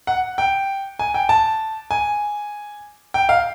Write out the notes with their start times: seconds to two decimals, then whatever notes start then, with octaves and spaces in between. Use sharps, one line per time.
0.07 F#5
0.38 G5
0.99 G#5
1.14 G5
1.29 A5
1.91 G#5
3.14 G5
3.29 F5